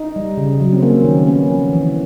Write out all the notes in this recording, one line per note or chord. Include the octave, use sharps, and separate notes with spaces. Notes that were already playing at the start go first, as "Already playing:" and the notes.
Already playing: D#4
G3
C#3
F#3
C4
A#3 C#4
D#3
B3 C#4
F3
E3